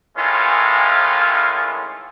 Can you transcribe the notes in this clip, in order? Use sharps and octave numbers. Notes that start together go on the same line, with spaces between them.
A2 D#3 E3 G#3 C#4 F4